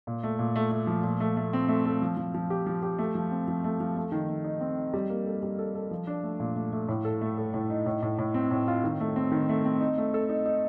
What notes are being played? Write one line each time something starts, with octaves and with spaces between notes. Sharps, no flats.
A#2
A3
A#2
A3
A3
F3
A#2
A3
A3
C4
A3
A3
F3
F3
F3
G4
F3
G4
A3
F3
C4
F3
A3
F3
A3
D#3
A3
D#4
C4
D#4
G3
A#3
A4
G3
A4
A4
F3
D4
A3
A#2
A3
A3
A2
A4
A3
A4
A2
D#4
A2
A2
A2
C4
A2
F4
D#3
A3
C4
D#3
A3
C4
D#4
A3
A4
D#4
D#4